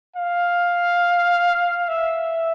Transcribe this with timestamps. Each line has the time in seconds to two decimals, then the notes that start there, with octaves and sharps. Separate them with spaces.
0.16 F5
1.89 E5